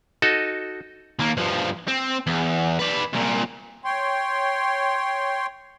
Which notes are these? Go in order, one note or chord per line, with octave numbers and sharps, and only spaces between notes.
D#4 F#4 A4 D#5
D#2 A#3
G2 F3
C4
E2
B4 D5
C2 A#2
C#5 G5 C6